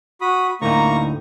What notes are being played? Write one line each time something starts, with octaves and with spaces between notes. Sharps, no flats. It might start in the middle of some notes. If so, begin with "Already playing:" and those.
F#4 B5 D#6
D2 A2 A#3 D#4 A#5 C#6